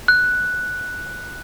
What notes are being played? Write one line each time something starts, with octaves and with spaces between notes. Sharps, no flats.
F#6